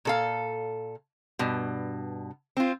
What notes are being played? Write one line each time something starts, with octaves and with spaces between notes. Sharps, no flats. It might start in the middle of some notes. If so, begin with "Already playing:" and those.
A#2 A4 F5
G2 B2
C4 F4